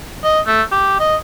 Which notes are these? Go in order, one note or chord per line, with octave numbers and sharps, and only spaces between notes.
D#5
A3
G4
D#5